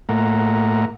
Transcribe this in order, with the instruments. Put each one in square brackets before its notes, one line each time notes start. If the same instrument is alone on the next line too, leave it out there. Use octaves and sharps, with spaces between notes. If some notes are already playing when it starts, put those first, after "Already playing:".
[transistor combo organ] A2 A3 A#3 F#5 A#5